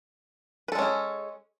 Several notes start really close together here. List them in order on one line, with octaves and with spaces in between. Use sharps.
B4 A4 G#3 C#4 G#4